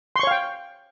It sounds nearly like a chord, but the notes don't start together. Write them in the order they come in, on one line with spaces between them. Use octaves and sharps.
C6 C#6 C#5 F5 G5